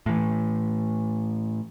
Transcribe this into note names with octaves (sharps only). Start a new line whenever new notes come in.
A2 E3